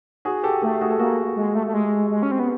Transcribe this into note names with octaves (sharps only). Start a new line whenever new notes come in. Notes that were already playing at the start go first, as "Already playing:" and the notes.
F#4 G#4
G4 A4
A3 G4 A4
F#4 G#4
A4
A#3 F#4 G#4
G#3
A3
A3
G#3
G#3
C#4
C4
B3